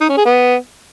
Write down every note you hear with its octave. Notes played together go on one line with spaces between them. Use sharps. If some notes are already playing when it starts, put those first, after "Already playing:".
D#4
C#4
G#4
B3